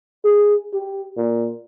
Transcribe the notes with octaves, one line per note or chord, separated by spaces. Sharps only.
G#4
G4
A#2